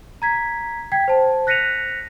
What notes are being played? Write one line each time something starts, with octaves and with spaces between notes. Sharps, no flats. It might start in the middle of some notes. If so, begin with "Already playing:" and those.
A#5 G#6 B6
G5 G#6 B6
C5 A5
F#6 A#6 B6 C#7 D#7 F7